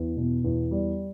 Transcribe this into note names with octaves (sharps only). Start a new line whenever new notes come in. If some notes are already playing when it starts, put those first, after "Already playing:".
Already playing: E2
B2
E2
G3